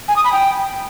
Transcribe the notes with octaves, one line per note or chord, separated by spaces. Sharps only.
G#5
D#6
B5
G5